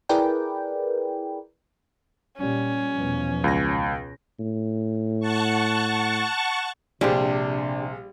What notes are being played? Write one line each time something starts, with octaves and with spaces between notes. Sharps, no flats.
E4 G#4 A#4 B4 D5 G5
A#2 G3 C#4
E2 B2 F3
C#2 A#6
A2
F#5 A5 C#6
A#1 C3 G3 D4 G4 G#4 C5